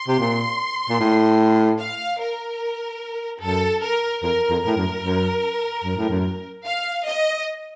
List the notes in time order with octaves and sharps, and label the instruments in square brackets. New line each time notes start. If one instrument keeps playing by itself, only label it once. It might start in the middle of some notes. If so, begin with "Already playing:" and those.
Already playing: [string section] C6
[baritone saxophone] C3
A#2
A#2
A2
[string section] F5
A#4
[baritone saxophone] F#2 [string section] A4
[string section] A#4
[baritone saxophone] F2 [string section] A#4
[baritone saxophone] F2
[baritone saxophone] A2 [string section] A#4
[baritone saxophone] F#2
F#2
F#2
A2
F#2
[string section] F5
D#5